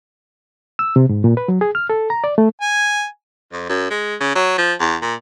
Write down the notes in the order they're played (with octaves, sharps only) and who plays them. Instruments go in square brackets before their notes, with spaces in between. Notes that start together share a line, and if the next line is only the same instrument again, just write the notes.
[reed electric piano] E6
C3
G#2
A#2
B4
F#3
G#4
F6
A4
A#5
D5
A3
[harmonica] G#5
[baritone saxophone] F2
F#2
G#3
C#3
F#3
F3
E2
A#2